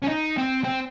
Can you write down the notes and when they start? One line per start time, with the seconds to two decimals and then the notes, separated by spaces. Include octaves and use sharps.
0.04 C#4
0.09 D#4
0.38 C4
0.64 C4